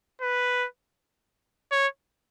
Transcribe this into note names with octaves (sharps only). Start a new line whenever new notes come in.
B4
C#5